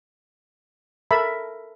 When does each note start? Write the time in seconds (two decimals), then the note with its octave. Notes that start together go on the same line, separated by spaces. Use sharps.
1.11 A4 A#4 E5 A5 B5